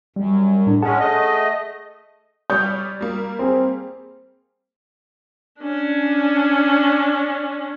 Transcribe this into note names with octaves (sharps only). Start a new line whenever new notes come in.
F#2 G3
A2 D4
G#3 C#4 G#4 F#5 A5
A3 D#5
G3 C#5 D5 D#6 G6
G3 A#3
C4 G#4
C#4 D4